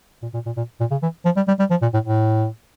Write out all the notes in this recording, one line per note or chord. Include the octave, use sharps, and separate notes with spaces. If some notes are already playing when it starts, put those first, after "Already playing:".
A#2
A#2
A#2
A#2
A#2
C#3
E3
F3
G3
G3
G3
F3
A#2
A2
A2